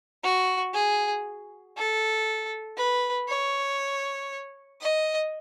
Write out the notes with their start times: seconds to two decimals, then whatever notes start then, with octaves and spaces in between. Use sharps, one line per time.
0.23 F#4
0.74 G#4
1.76 A4
2.77 B4
3.28 C#5
4.81 D#5